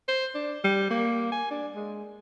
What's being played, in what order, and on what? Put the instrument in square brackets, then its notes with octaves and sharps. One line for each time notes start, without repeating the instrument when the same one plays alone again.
[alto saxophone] C5
D4
G3
A#3
G#5
D4
G#3